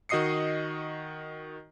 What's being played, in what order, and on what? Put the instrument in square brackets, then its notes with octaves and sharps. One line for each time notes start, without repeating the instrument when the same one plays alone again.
[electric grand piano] D#3 F#4 D#5 D#6 C7 C#7